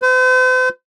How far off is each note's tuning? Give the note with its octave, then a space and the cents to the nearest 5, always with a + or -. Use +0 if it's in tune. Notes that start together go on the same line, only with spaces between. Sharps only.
C5 -45